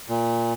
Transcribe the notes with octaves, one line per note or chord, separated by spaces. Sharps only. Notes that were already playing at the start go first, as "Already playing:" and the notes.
A#2